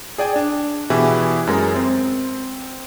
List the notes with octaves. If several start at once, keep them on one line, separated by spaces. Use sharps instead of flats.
G#4 D5 G5 G#5
D4
B2 E3 E4 G4 G#4
F#2 G#3 A#4
C4